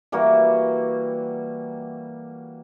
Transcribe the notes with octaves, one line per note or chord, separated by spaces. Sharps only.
E3 G3 A#3 F#4